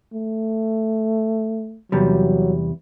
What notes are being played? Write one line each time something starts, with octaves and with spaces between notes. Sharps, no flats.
A3
E2 C3 F#3 G3